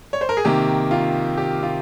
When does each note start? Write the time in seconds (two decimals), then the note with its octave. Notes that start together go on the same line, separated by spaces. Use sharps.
0.13 C#5
0.21 C5
0.29 A#4
0.37 G#4
0.45 C3 D#3 A#3 G4
0.91 F4
1.37 G4
1.63 F4